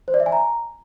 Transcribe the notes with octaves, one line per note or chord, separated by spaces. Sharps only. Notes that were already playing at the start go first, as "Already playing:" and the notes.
C5
D5
E5
G#5
A#5